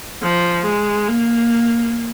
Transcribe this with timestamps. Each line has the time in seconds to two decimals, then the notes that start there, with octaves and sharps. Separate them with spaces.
0.22 F3
0.65 G#3
1.08 A#3